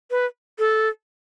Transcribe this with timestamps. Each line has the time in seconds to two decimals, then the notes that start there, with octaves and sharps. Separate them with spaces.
0.11 B4
0.59 A4